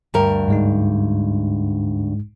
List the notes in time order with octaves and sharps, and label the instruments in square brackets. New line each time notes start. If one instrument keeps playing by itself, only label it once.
[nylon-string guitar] D2 G2 A#4
[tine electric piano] G#2 G#3 D#4